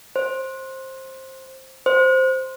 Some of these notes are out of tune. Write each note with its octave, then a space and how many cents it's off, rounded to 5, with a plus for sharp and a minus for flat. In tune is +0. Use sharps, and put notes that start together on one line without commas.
C5 +15
C5 +0